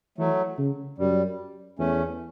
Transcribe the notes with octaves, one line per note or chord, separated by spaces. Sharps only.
E3 F#3 A3
C#3
F#2 G3
E2 A3 C#4